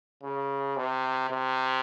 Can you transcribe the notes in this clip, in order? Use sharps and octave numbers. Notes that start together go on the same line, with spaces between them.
C#3
C3
C3